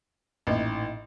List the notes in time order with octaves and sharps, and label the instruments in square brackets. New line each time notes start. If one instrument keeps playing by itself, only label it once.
[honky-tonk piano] A1 [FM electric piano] A#2 D#4 E4